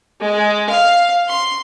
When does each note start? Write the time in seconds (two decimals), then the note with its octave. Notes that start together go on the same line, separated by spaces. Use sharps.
0.20 G#3
0.70 F5
1.28 C6